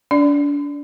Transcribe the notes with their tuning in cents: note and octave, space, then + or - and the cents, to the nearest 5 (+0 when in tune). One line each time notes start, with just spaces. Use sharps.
D4 -30 D5 +0